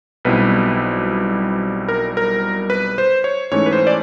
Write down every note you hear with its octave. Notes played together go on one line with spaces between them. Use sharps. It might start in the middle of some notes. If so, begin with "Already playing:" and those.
B1 B2 G3 C4 E4 B4
A#4
A#4
B4
C5
C#5
G#2 E3 A3 C#4 C#5
B4
C5
D5